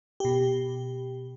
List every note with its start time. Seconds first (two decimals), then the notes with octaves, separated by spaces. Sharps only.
0.20 B2 G4